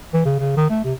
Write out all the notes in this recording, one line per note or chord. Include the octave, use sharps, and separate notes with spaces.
E3
C#3
C#3
D#3
A3
C3